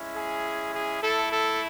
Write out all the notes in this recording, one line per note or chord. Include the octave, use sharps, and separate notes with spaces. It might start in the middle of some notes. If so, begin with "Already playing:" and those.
Already playing: G#3 C#4 E4
G#4
G#4
A3 E4 A4
A4